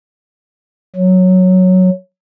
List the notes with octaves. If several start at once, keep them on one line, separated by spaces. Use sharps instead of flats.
F#3